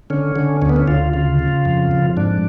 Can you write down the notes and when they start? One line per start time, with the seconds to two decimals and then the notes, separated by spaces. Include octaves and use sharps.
0.10 D3 C#4
0.36 D3
0.62 D2 C#4
0.70 B3
0.76 C#4
0.87 D2 F4
1.14 C#3 F4
1.39 C#3
1.65 F2
1.91 F2
2.17 G#2 D4